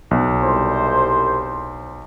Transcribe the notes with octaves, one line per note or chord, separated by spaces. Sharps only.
B1
C2 C5